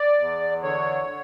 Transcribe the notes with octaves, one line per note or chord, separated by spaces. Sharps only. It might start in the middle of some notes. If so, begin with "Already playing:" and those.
Already playing: D5
E2
D3 C#5
D3